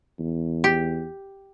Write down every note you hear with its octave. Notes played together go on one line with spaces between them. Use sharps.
E2
G4